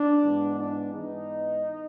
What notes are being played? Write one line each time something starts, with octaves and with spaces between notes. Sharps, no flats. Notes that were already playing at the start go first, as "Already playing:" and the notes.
Already playing: D4
G#2 E3 G#3 B3
D4
G#2 E3 G#3 B3 D#4